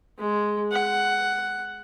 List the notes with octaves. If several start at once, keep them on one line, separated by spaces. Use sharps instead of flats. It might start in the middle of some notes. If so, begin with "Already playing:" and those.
G#3
F#5